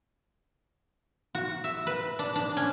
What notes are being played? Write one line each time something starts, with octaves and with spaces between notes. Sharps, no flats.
F#4
E5
B4
D4
D4
C#4